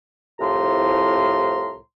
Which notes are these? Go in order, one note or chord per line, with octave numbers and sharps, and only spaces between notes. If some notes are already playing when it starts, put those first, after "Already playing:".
C2 A2 F3 A#5 C6